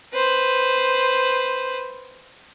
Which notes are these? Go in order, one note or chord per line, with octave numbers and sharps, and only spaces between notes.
B4 C5